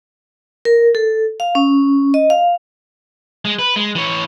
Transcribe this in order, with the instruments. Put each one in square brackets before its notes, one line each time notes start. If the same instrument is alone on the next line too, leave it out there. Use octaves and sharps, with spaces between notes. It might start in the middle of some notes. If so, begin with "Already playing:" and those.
[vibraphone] A#4
A4
F5
C#4
D#5
F5
[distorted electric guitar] G#3
B4
G#3
E3 C#5